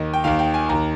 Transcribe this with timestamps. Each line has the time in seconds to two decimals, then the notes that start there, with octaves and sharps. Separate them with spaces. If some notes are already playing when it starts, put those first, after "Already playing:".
Already playing: D#2 D#3 D#5
0.14 G5
0.24 D#2 D#3 F5
0.39 G5
0.54 G#5
0.69 D#2 D#3 A#5